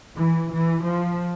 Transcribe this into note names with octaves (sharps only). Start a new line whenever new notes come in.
E3
E3
F3